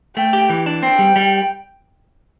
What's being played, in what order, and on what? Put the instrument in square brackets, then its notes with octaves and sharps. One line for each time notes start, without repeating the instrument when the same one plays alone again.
[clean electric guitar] A3 [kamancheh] G5
[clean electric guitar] G4
E3
D4
[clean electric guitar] C4 [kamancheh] G5
[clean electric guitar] G3
G3